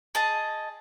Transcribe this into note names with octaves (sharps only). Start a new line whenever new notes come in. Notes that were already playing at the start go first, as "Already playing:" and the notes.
G#4 D#5 A5